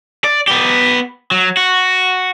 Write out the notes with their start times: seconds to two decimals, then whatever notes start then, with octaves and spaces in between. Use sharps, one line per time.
0.24 D5
0.48 B3 G4
1.31 F#3
1.57 F#4